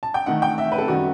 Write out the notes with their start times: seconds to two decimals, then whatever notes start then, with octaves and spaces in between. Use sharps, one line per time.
0.03 A5
0.14 G5
0.26 D#3 A3 D#4 F#5
0.42 G5
0.58 E5
0.72 B4
0.78 A4
0.88 F#2 D#3 G3 F#4